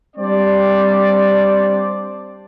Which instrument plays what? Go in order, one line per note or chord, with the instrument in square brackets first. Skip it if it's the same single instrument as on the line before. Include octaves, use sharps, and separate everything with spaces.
[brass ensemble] G3 C4 D4 C5 D5